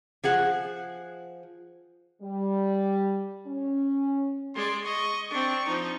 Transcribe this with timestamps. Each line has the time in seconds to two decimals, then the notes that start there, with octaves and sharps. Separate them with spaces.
0.24 F3 G#4 F#5
2.21 G3
3.47 C#4
4.55 G#3 D5 C6
4.84 D#5 C#6
5.31 C4 D4 C#6
5.66 F3 D#4